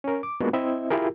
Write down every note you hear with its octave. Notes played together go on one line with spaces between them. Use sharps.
C#4 A#4
D6
G#3 A#3 B3 D4 F4 F#4
C4 E4 D#5 E5
E4 F4 G4 G#4 A#4